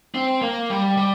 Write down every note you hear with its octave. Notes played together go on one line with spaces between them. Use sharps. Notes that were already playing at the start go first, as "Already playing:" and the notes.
C4
A#3
G3
G3